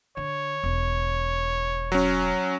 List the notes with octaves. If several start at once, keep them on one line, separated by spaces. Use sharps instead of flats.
D3 C#5
E1
F#3 C#4